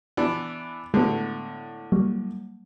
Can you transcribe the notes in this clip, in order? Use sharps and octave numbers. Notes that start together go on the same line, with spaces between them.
E3 B3 D4
A2 D3 G#3 B3
F#3 G3 A#3